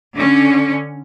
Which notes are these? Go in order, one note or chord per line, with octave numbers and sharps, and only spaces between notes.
D3 C#4